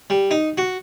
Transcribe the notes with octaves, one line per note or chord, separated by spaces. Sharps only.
G3
D#4
F#4